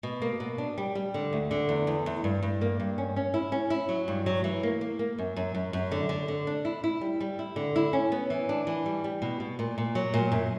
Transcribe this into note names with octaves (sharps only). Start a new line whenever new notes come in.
B2
A#3
B2
D4
G3
G3
D3
D2
D3
E2
E2
E2
G2
G2
A#3
G2
C#4
C#4
E4
C#4
E4
F#3
G2
F#3
E3
A#3
A#3
A#3
F#2
F#2
F#2
F#2
D3
D3
D3
D4
E4
E4
G3
G3
E4
D3
E4
C#4
B3
E3
D4
E3
G3
G3
B2
B2
A#2
A#2
F#3
A#2
F#2